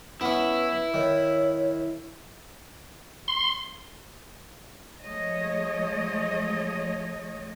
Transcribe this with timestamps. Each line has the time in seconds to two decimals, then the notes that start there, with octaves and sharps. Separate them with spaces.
0.21 B3 C#4 E4 B4 E5
0.94 D#3 C#5
3.28 C6
5.03 F3 G#3 A3 C#5 D#5